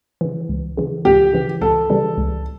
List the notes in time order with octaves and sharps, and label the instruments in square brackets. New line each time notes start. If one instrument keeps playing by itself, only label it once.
[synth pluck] C#3 E3
C#2
C#3 E3
[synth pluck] C#2 [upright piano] G4
[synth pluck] C#3 E3
[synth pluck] C#2 [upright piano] A4
[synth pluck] C#3 E3 G3
C#2